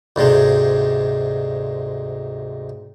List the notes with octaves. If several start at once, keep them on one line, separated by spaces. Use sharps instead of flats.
D2 G#2 C3 G#3